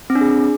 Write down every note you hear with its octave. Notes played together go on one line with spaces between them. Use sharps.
C4
D4
G#4